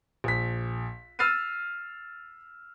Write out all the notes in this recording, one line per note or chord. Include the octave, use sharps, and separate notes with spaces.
A#1 B6
E6 F6 A6 C7 D#7